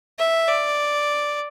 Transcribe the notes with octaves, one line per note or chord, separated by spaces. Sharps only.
E5
D5